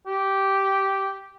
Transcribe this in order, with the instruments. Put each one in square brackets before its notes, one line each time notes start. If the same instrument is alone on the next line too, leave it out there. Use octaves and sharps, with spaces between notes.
[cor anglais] G4